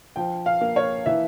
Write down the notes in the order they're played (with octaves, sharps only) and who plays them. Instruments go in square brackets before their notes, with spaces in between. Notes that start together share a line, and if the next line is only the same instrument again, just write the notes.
[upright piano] F3 G5
F5
A#3
C#5
E3 E5